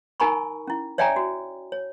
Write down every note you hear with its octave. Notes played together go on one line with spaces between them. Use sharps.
D#4 A#4 G#5 A#5 B5 C#6
C#4 E4
C#5 D5 E5 G5 G#5 A#5
F#4
C#5